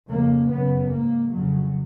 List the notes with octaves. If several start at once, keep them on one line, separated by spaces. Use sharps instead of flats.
F2 C#3 A#3
F#2 C#3 B3
G#2 A#3
F2 C#3 F#3